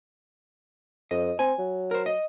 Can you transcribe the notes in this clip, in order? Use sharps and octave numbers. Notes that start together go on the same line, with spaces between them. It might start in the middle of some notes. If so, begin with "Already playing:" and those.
F2 D#5
C4 G#5
F#3
A#4 C5
D#5